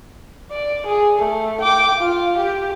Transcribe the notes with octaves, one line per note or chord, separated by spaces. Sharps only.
D5
G#4
A3
G5 D6
F4
G4